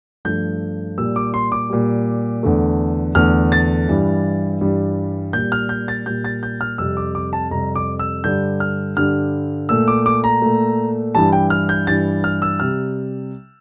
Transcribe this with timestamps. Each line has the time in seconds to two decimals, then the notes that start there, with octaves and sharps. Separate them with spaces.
0.25 G2 F3 A3 G6
0.98 A#2 G3 E6
1.16 D6
1.34 C6
1.52 D6
1.70 A#2 G3
2.43 E2 D3 A3
3.15 E2 D3 A3 F6
3.52 A6
3.89 G2 E3 G3
4.61 G2 E3 G3
5.33 A#2 G3 G6
5.52 F6
5.69 G6
5.88 A6
6.06 A#2 G3 G6
6.24 A6
6.43 G6
6.61 F6
6.78 F2 C3 G3 E6
6.97 D6
7.15 D6
7.33 A5
7.51 F2 C3 G3 A#5
7.75 D6
7.99 E6
8.24 G2 D3 G3 G6
8.60 F6
8.97 G2 D3 G3 F6
9.69 A#2 A3 E6
9.88 D6
10.06 D6
10.24 A#5
10.42 A#2 A3
11.15 G2 E3 G3 A5
11.33 G5
11.50 F6
11.69 G6
11.87 G2 E3 G3 A6
12.24 F6
12.42 E6
12.60 C3 G3 F6